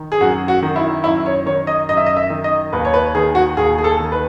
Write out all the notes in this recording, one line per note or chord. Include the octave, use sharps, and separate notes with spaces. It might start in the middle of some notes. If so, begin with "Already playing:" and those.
Already playing: D#3
G#4
F#2 F#4
F#4
D#3
E4
F#2 E4
C#5
D#3 C#5
D#5
F#2 D#5
E5
D#5
E5
D#3
D#5
D#2 B4
C#5
B4
D#3 G#4
F#4
D#2 G#4
G#4
A4
D#3
B4